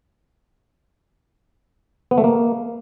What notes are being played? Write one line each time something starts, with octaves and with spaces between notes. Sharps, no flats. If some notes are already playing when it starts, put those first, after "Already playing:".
B3
A3
A#3